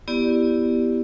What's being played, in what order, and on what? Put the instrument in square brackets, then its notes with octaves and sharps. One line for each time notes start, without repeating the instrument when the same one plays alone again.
[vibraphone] B3 E4 G4 D5